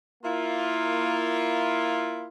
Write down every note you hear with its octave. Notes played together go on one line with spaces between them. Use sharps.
A#3 E4 F4